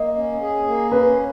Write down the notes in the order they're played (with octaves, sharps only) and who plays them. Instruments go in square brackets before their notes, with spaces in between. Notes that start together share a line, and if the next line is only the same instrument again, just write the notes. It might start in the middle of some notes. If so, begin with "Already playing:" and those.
Already playing: [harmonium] A#3 [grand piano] D#5
[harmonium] C#4
G#4
A#3
[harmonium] C#4 [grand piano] B4